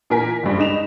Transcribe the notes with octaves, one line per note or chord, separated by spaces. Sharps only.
A#2 E3 A#4 G#5 B6
F#1 G2
G#3 D#4 E7 F7